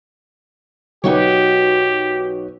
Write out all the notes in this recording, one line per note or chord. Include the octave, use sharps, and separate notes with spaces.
B1 D#4 F#4 G4 B4 C#5